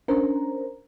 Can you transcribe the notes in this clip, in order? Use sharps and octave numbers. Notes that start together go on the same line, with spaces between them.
C#4 D4 A#4 C5 A#5